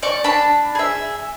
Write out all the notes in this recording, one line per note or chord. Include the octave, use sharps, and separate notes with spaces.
D5 C#6
D4 A5 B5
G#4 E5